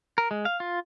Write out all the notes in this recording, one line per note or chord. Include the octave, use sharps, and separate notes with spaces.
A#4
G#3
F5
F4